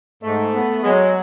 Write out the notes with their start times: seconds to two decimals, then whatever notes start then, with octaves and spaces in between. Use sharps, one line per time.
0.23 G#2 A3
0.53 B3
0.84 F#3 G#3